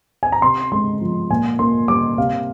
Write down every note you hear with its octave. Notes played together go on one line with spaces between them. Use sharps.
G#5
A#5
C3 C6
G#3 C6
F3
A#2 G#5
A#3 C6
G3 D6
C3 F5